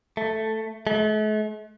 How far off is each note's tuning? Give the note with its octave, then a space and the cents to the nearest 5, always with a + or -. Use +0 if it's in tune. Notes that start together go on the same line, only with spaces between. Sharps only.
A3 +0
A3 -45